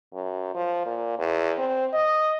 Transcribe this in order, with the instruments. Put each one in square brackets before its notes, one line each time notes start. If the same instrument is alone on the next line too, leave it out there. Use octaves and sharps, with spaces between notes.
[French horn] F#2
F3
A#2
E2
C4
D#5